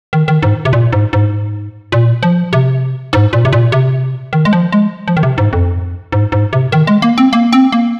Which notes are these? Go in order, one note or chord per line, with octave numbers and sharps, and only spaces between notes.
D#3
D#3
G#2
C3
A#2
G#2
G#2
A#2
F3
C3
G#2
A#2
C3
A#2
C3
D#3
G#3
F3
G#3
F3
D#3
C3
G#2
F2
G#2
G#2
C3
D#3
G#3
A#3
C4
A#3
C4
A#3